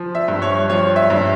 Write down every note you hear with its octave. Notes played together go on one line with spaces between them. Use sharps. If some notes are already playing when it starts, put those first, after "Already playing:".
Already playing: F3
E5
G2
C#5
F3 C#5
E5
G2